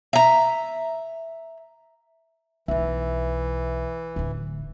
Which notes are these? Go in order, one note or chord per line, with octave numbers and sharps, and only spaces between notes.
E5 A#5
B1 E3 D#4 E5
D1 D2